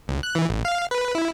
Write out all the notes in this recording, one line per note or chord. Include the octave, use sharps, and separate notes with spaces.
C#2
F#6
E3
A1
F5
B4
E4